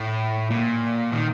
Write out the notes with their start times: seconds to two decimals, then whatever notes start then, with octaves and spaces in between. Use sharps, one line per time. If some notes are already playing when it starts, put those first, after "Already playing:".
Already playing: A2
0.50 A#2
1.12 D#3